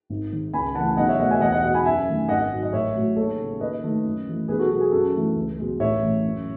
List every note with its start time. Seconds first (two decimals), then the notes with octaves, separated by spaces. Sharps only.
0.10 G#1
0.32 G#2 D#3
0.53 C#2 G#5 B5
0.75 C#3 E3 A3 F#5 A5
0.97 B1 D#5 F#5
1.08 C#5 E5
1.19 B2 A3 D#5 F#5
1.31 E5 G#5
1.41 E2 D#5 F#5
1.52 D#5 F#5
1.63 B2 G#3 D#5 F#5
1.74 G#5 B5
1.85 F#2 E5 G#5
2.07 D#3 A3
2.29 G#1 D#5 F#5
2.51 G#2 F#3
2.63 D#5
2.73 A1 C#5 E5
2.94 A2 F#3 A3
3.16 D#2 A4 C#5
3.38 C#3 G#3
3.60 D#2 B4 D#5
3.83 D#3 A3
4.04 F#2
4.27 E3 A3
4.48 B1 G#4 B4
4.59 F#4 A4
4.70 B2 G#3 F#4 A4
4.81 G#4
4.92 F#2 F#4 A4
5.14 E3 A3
5.36 C#2
5.58 B2 G#3
5.80 A1 C#5 E5
6.03 A2 E3
6.25 F#2